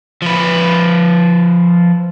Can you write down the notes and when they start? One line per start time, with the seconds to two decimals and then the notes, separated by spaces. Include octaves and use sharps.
0.22 F3 B4